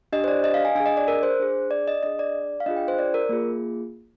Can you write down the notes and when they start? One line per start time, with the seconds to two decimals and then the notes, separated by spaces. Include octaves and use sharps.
0.13 D4 G4 D#5
0.24 C5
0.28 D5
0.44 D#5
0.54 F5
0.65 G#5
0.75 D4 G#4 G#5
0.86 D#5
0.97 D5
1.08 A#4
1.23 C5
1.39 D4 G#4
1.71 D5
1.88 D#5
2.03 D4 G#4 D#5
2.19 D5
2.60 F5
2.66 D4 F4 G#4 D#5
2.76 G5
2.88 C5
2.99 D5
3.14 A#4
3.29 A#3 F4 G#4